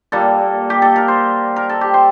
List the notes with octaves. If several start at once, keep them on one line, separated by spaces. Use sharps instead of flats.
A#2 G3 A#3 A4
G4
A4
A#4
C5
A#4
A4
G4
C5